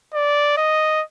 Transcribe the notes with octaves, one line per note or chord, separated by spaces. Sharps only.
D5
D#5